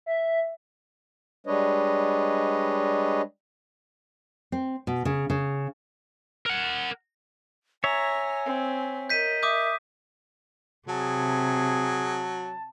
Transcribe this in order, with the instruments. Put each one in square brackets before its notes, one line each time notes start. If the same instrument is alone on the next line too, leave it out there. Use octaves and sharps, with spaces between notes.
[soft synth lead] E5
[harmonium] G3 G#3 D4 B4 C#5 D#5
[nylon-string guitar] C4
B2
C#3
C#3
[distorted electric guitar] A#4 F#5
[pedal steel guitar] C#5 E5 [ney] G#5 [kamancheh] A#5
[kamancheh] C4
[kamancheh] A#4 D#5 [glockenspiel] G6 B6 D#7
[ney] E5 [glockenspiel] D6 D#6 G6
[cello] C3 [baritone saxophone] F#3 [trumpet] G#4 [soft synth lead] A5